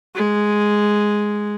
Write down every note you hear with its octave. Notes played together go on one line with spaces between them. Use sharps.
G#3